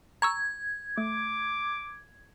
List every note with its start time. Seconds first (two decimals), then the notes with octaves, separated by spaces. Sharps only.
0.22 A#5 C#6 E6 G#6
0.98 A3 D6